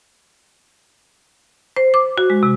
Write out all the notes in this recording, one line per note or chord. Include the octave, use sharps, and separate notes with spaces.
C5
D6
F#4
G#3
C3